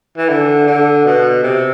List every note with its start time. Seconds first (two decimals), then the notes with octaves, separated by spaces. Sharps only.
0.17 E3
0.29 D3
0.67 D3
1.05 B2
1.43 C3